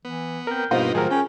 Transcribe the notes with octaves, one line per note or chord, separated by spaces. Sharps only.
E3 B3
C4 A#4 G6
G2 B2 G3 A#3 D#4 F4 C5
A2 D#3 F#3 G#4 A#4
C#4 G5